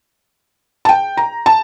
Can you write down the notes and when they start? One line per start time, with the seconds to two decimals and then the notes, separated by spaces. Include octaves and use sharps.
0.85 A5
0.89 G5
1.17 A#5
1.46 A5